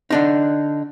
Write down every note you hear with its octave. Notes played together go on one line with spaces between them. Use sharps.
D3 D4 D#4